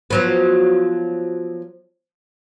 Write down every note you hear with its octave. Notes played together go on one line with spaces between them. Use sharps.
F3 F#3 B3